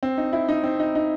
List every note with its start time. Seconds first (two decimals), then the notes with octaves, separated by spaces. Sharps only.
0.03 C4
0.18 D#4
0.33 E4
0.49 D#4
0.64 C4
0.79 D#4
0.95 D#4